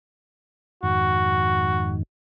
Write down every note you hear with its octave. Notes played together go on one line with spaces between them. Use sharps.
F2 G#2 D#3 F#4